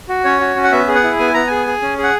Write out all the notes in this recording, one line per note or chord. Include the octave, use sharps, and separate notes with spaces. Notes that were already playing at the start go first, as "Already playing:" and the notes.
F#4
C#4 C#5
F#4
C#4
F#5
B3 E5
G#4
F#5
E4
B3 G#5
B3 A#5
G#4 G#5
G#4
C#4
G#4
F#5